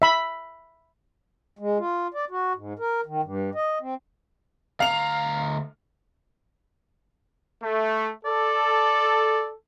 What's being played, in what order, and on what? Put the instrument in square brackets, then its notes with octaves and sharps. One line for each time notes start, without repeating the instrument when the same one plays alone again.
[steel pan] E5 B5
[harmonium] G#3
F4
D5
F#4
G#2
A#4
D#3
G2
D#5
C4
[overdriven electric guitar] D2 A#5 [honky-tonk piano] F5 F7
[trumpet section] A3
[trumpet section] A4 [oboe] D5